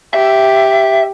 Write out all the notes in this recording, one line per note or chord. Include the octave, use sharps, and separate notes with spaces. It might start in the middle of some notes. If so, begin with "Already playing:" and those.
G4 E5